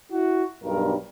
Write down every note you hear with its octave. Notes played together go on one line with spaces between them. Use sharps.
E4 F#4
B1 G2 A#4